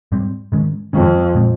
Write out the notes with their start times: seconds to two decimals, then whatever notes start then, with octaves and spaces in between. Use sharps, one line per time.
0.12 G#2 G3 C4
0.52 G#2 D#3 G#3 C#4
0.93 F2 G#2 D#3 G#3 C#4
1.35 A#2 G#3 C4